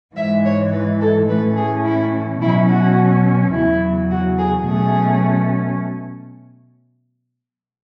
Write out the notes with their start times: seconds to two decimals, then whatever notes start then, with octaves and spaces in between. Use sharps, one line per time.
0.16 G#2 E3 G#3 E5
0.45 C#5
0.72 B4
1.01 A4
1.28 A2 E3 A3 C#4 B4
1.56 G#4
1.85 E4
2.41 B2 F#3 C#4 E4
2.69 F#4
3.53 E2 C#3 F#3 E4
4.10 F#4
4.38 G#4
4.66 B2 F#3 A3 C#4 G#4